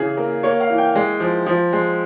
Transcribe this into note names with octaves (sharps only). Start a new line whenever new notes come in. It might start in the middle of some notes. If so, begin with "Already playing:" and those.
Already playing: C#3 E3 G#4
A#3 A#4
A#3 C#5
F5
E3
G5
G#3
F3
F3
G#3